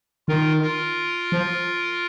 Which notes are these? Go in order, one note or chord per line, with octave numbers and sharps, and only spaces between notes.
D#3 F4 A#4
F4 A#4
F3